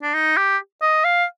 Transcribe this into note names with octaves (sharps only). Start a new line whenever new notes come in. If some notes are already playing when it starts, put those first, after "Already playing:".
D4
D#4
G4
D#5
F5